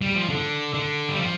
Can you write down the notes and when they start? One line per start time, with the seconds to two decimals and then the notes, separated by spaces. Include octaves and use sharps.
0.02 G3
0.15 F3
0.30 D3
0.74 D3
1.09 G3
1.19 F3